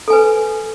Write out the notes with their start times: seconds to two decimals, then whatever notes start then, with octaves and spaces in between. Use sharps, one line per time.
0.08 A4
0.10 G#5
0.13 B4